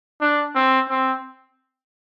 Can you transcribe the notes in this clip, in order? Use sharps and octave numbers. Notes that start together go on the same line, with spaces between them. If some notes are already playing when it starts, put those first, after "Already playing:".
D4
C4
C4